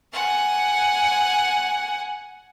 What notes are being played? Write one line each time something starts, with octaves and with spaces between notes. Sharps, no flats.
F#5 G#5